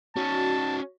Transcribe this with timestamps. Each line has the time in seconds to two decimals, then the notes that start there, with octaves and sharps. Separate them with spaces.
0.16 C#4 D#4 F#4 A5